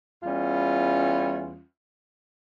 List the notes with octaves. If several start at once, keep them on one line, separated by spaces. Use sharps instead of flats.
E2 G3 C#4 F4